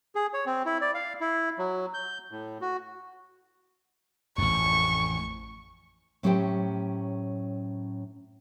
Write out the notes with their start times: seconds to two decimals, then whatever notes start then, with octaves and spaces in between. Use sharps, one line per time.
0.15 G#4
0.33 C#5
0.46 C4
0.66 E4
0.81 D5
0.94 F5
1.20 E4
1.58 F#3
1.94 G6
2.32 A2
2.61 F#4
4.38 A1 F2 C#6
6.23 A2 F#3 C#4 G4 C5 G5